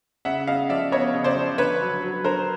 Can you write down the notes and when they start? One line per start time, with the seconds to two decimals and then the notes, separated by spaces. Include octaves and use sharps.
0.25 C#3 E5 F#5
0.47 C#3 D#5 F5
0.69 F3 D5 E5
0.92 B3 C#5 D#5
1.14 C#3
1.24 C5 D5
1.36 F3
1.58 D3 B4 C#5
1.81 F#3
2.02 F#3
2.24 D3 A#4 C5